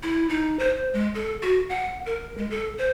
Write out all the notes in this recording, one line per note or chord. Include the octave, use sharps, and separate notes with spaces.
E4
D#4
C5
G#3
A4
F#4
F#5
A#4
G#3
A4
C5